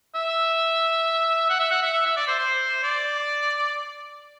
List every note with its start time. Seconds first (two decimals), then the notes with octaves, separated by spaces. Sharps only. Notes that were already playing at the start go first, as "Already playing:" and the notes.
0.15 E5
1.50 F#5
1.60 E5
1.71 F#5
1.82 E5
1.93 E5
2.05 E5
2.16 D5
2.27 C5
2.39 C5
2.83 D5